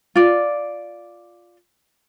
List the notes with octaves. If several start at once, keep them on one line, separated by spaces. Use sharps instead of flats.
F4 D5